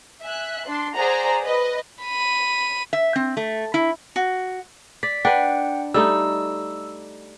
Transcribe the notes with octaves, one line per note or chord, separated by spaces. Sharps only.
E5 G#5 F#6
D4 C6
G#4 C5 D5 F#5 A#5
B4 D#5
B5 D#7
E5
C4
A3
E4
F#4
D5 B6
D4 B4 F#5 G5
G3 A3 D#4 E6